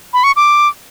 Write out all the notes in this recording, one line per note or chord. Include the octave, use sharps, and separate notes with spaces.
B5
C#6
D6